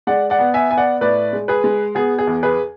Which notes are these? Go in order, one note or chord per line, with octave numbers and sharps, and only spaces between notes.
G#3 D5 F#5
D5 F#5
B3
E5 G#5
B3 G#5
D5 F#5
A2 B4 D5
G#3
G#4 B4
G#3
B3 G#4
G#4
E2
G#4 B4